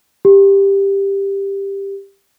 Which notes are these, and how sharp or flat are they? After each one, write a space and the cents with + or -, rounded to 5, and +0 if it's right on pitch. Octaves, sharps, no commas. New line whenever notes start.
G4 +10